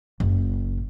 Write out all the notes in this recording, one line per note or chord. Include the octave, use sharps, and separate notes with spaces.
F#1